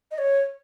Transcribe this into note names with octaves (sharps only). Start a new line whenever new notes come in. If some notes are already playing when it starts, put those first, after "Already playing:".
D#5
C#5